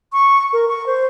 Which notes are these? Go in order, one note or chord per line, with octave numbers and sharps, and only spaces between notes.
C#6
A#4
C#6
C5